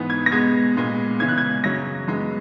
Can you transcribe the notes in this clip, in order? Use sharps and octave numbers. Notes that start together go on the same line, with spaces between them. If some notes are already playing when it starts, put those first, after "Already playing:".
Already playing: G#2 E3 B3
G#6
A#6
B2 G#3 B3 G#6
A#2 G#3 B3
C#3 E3 G#3 B3 G#6
F#6
G#6
F#2 C#3 F#3 A#6
F#2 E3 G#3 B3